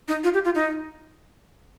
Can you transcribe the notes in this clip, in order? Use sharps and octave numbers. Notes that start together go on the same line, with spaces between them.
D#4
F4
G4
F4
D#4